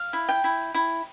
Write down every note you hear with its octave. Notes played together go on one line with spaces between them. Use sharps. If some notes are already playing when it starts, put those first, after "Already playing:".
Already playing: F5
E4
G5
E4
E4